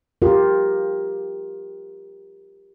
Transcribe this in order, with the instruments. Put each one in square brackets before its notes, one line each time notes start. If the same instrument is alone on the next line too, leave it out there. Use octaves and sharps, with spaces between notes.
[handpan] F4 G4 A#4